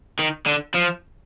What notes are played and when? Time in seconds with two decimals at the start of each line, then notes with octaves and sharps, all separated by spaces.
0.19 D#3
0.46 D3
0.75 F3